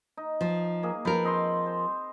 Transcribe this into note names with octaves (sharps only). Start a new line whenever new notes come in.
D#4
F3
A#3 G#4
F3 A#4 B4
C4 D#5 C6
C5